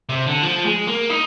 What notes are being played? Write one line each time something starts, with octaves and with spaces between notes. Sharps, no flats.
C3
D3
F3
G#3
A#3
D#4